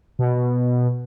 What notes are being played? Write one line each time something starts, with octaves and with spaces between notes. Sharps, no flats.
B2